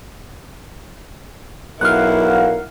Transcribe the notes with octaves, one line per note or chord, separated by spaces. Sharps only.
B1 E4 A#4 F5 F#5